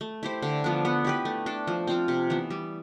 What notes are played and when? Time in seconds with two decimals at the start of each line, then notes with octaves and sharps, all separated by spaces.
0.01 A3
0.23 E4 G4 C5
0.42 D3
0.64 F3 B3 D4
0.85 B3
1.04 E4 G4 B4
1.25 A3
1.46 D4 A4
1.67 F3
1.87 C4 F4 C5
2.08 C3
2.30 E3 B3
2.50 G3